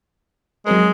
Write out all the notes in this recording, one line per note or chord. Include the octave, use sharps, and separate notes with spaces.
F#3 G#3 C4 A#4